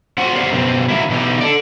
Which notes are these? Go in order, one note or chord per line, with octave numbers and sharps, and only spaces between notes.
C4 F4 F#4 F#5
G4 A#4 C5 D5 F#5
F#2 B2 C4
D#3 F#3 A#3 E4
B2 E3 D#4 G4
A4 D5